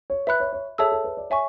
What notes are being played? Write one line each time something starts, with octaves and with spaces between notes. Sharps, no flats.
C#5
B4 E5 B5 F#6
C#5
C#5
G#4 A4 C#5 E5 A5 E6
A4
B4
D5
C#5 E5 G#5 C#6